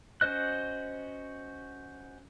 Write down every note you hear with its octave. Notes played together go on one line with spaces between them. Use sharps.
C#4 F#4 C5 D#5 F#6